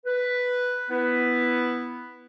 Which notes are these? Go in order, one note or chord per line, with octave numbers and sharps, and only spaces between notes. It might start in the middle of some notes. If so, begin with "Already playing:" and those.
B4
B3 E4 B4